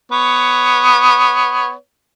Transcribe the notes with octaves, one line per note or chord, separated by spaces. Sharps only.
B3 C#5